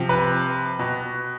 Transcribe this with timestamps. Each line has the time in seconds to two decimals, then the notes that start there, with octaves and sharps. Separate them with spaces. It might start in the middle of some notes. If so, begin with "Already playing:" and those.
Already playing: C3 F3
0.09 B4
0.79 B2